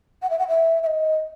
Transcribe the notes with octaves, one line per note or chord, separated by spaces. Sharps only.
F#5
E5
F#5
E5
E5
D#5